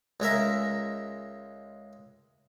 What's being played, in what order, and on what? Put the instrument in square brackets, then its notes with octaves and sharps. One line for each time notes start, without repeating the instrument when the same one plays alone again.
[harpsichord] C#2 G#3 A#4 E5